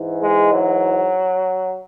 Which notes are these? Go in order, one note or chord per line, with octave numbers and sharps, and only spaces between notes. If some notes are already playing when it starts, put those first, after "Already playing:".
Already playing: G#2 E3
G#3
F#3